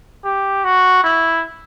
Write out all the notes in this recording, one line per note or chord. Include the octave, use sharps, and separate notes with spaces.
G4
F#4
E4